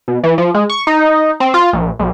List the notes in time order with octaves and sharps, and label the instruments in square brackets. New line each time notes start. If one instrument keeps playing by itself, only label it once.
[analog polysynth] B2
E3
F3
G#3
C#6
D#4
C4
F4
A#1
B1